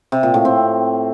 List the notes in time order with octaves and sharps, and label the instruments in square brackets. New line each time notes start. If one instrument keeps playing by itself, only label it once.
[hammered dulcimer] C3
A#2
A2
C4